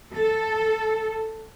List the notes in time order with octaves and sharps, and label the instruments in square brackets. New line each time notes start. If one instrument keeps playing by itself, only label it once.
[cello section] A4